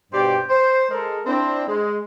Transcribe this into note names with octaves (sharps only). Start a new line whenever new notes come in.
G2 B2 G4 C5 D5 G5
C5
G#3 A4 A#4
C4 D4 E4
G#3